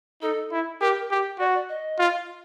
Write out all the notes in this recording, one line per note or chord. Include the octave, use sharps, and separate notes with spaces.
D#4 A4
E4
G4 A#4
G4
F#4 D5
D5
D#5
F4